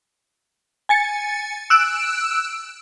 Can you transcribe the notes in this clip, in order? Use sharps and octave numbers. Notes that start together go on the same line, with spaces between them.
G#5 A6 C#7
E6 F#6 D7 E7